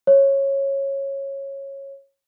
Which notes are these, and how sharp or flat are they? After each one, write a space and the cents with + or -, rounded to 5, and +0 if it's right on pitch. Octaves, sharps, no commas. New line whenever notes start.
C#5 -15